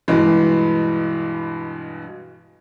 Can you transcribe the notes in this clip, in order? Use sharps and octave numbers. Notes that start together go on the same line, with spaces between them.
G2 B2 E3 G#3